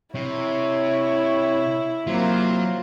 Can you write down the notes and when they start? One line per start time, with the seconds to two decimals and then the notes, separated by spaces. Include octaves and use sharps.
0.15 C3 E4 C#5
2.07 C3 F#3 A#3 F4 C5